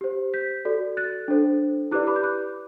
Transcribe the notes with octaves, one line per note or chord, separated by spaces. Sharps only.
G4 C5
G6 B6
F#4 A4 D5
F#6 A6
D4 A4 C5
E4 G4 B4 D5 D6 F#6
B5 D6
G6
D6 F#6